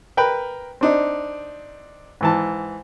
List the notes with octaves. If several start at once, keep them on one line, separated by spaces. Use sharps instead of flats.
A#4 B4 G5 B5
C4 D4 D#4
G#2 E3 A5